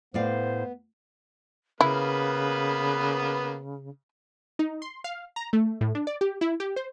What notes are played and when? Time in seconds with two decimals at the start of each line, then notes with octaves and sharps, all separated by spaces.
0.14 A2 B3 C5 D5 F5
1.81 C#3 A#3 B3 E4 B4
4.59 D#4
4.82 C6
5.04 F5
5.36 A#5
5.53 A3
5.81 A2
5.95 D4
6.07 D5
6.21 G4
6.41 E4
6.60 G4
6.76 C5